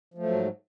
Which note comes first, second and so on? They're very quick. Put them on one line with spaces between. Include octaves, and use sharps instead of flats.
F3 A3 F#3 G#2